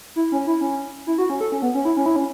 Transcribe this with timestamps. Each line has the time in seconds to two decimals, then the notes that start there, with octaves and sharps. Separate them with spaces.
0.16 E4
0.32 C#4
0.47 E4
0.61 C#4
1.07 E4
1.18 F#4
1.30 C#4
1.41 A4
1.52 C#4
1.62 B3
1.75 C#4
1.85 E4
1.97 C#4
2.06 E4
2.16 C#4